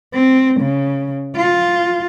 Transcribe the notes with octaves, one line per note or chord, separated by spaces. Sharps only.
C4
C#3
F4